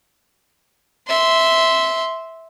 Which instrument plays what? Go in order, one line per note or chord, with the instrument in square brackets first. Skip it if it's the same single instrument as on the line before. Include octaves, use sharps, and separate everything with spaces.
[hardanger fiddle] E5 C6